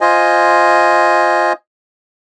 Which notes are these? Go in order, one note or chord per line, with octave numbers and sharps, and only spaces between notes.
F4 C5 D#5 G#5